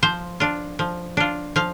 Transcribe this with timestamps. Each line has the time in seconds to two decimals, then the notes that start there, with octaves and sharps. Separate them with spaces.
0.03 F3 C5
0.40 D4 F4
0.79 F3
1.17 D4 F4
1.56 F3 F5